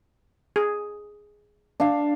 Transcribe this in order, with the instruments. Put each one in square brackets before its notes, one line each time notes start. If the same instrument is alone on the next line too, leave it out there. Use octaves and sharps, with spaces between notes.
[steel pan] G#4
[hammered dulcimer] D4 F5